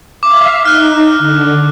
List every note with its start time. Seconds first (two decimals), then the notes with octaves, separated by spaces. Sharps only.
0.23 E5 F5 D6
0.63 D#4 D6 F6 F#6
1.19 D3